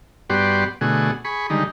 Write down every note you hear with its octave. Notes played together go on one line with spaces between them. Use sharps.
G2 B3 F#4 G4 D5 C6
B2 D3 A3 F#4 G#4
G#4 B5 C#6
D3 D#3 G3 G#3 D#4